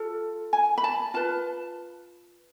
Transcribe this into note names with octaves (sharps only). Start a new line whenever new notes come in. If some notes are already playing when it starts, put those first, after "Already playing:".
Already playing: F4 A4
G#5
B5
A5
F4 B4 A5